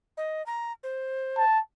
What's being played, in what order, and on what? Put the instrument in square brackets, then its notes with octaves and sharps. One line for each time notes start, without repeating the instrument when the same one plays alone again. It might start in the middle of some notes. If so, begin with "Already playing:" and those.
[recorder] D#5
A#5
C5
[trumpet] A5